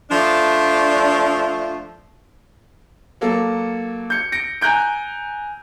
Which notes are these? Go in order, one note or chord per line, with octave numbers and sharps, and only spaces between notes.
F3 A3 D4
F#3 A#3 A4
G6 C#7
A#6 C#7 D7
G#5 A#5 F#6 G6 D7